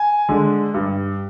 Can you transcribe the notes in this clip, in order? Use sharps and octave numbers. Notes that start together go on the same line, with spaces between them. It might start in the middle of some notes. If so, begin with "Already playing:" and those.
Already playing: G#5
D3 G#3
G2